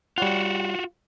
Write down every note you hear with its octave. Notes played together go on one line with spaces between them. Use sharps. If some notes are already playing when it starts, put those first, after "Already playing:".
G3 F4 F#4 C#5 F#5